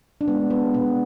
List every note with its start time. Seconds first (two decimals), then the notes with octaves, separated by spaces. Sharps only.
0.21 D4
0.28 G#3 B3
0.50 B3
0.74 B2 B3